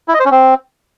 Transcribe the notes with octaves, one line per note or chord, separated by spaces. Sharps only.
E4
D#5
C5
C#4
C4